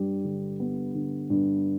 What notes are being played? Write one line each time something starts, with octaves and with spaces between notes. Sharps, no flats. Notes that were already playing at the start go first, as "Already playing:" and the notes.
Already playing: G2 G3
D3
B3
D3
G2